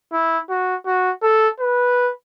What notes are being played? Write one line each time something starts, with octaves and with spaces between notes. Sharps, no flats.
E4
F#4
F#4
A4
B4